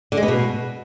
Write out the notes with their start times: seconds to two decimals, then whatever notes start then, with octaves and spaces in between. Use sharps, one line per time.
0.12 D3
0.17 G#3
0.23 B3
0.28 B2